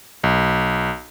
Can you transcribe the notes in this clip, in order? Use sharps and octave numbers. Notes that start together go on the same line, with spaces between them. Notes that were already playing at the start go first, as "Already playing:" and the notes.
B1